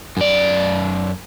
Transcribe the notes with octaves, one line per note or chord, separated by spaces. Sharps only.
F#2 D5